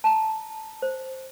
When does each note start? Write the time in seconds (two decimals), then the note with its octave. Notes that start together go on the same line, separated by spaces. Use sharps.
0.04 A5 A#5
0.82 C5